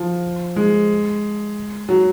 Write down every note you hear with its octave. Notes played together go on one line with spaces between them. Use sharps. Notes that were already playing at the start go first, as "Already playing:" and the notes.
Already playing: F3
G#3
F#3